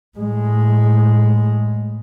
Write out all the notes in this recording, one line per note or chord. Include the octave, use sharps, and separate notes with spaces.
A2 G#3